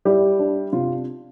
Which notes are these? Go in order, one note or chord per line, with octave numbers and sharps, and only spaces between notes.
G3 E4 G4
D4
C3 F4